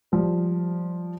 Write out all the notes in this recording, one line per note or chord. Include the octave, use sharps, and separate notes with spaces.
F3 G3